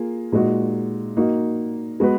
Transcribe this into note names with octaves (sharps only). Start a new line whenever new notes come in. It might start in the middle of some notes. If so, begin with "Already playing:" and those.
Already playing: A#3 F4 G#4
A#2 G#3 D#4 F#4
A#3 D#4 F#4
G#3 B3 F#4 B4